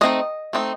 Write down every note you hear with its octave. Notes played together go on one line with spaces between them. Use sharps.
A3 C4 D#4 D#5
A3 C4 D#4